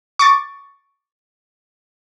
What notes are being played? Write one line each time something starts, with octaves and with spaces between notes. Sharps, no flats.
C#6 D6 A6